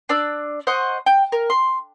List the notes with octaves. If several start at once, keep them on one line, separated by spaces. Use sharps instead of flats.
D4 D5 E6
C5 D#5 F#5 C#6
G5
A#4
C6